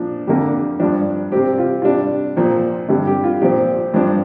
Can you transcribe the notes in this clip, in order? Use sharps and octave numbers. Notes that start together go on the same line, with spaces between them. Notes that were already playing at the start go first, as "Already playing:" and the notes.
Already playing: A#2 F3 D4
F2 D3 A#3 G4
G2 F3 D4
C3 G3 C4 G4
F4
C3 G3 D4 F4
A#2 F3 C4
G2 D3 G3
G4
F4
A#2 F3 C4 G4
G2 F3 D4